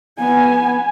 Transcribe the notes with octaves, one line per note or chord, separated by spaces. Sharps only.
B3 G#5